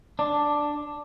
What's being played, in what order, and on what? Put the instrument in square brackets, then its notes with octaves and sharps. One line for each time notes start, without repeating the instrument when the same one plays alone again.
[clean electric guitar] D4